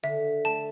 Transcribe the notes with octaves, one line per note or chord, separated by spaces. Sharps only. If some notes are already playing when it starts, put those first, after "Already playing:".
D3 E5
A3 A5